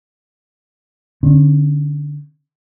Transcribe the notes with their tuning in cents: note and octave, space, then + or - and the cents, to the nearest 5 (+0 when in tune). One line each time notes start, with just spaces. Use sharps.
D3 +0 C#4 -35